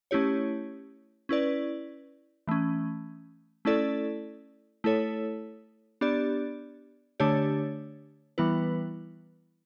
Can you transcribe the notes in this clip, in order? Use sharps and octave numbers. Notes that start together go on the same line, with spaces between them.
A3 C#4 E4 G4 C#5
C#4 E4 B4 D5
E3 A3 C#4
A3 C#4 E4 A4 D5
A3 E4 A4 C#5
B3 D4 G4 D5
D3 A3 D4 G4 C#5
E3 G3 B3 E4 B4